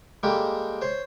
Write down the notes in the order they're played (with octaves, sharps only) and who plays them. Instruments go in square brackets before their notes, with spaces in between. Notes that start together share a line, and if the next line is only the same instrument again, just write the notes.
[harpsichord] G3 G#3 A#3 G4 A4
C5 C#5